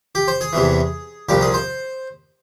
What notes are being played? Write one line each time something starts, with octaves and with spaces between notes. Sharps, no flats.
G4
C5
G#4
E2 C3 E3
C2 A#2 F3 G4
G#4
C5